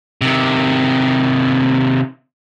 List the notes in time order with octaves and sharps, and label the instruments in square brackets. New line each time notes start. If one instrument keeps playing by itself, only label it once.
[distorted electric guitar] C3 D#3